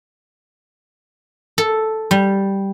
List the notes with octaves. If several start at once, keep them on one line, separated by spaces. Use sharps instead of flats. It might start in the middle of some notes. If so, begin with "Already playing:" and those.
A4
G3